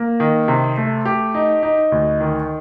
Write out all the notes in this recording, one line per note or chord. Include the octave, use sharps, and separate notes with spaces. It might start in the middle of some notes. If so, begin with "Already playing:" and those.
Already playing: A#3
D#3
C3
A3
G4
D#4
D#4
D2
D#3